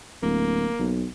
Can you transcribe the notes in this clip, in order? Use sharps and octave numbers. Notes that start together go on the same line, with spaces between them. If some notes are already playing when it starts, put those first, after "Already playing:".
D1 A#3
B1